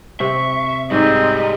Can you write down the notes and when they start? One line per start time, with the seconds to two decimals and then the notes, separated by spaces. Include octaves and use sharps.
0.20 C3 C4 E5 C#6
0.91 G#2 G3 C4 G#4 D5 D#5 A#5